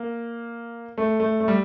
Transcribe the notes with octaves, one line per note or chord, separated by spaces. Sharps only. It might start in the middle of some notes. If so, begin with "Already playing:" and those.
Already playing: A#3
A3
A3
A3
G3